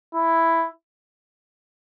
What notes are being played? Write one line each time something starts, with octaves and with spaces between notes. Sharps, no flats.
E4